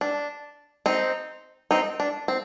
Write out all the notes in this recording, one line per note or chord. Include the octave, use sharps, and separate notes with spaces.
D4
C4 D#4
C4 D#4
D4
C4